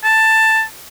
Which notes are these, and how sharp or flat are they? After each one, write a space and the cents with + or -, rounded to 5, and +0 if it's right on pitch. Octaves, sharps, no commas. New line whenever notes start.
A5 +10